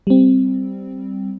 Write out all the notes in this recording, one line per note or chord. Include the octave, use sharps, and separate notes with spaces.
G3 C4